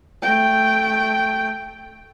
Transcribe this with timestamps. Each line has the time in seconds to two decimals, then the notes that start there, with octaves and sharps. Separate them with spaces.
0.22 A3 G5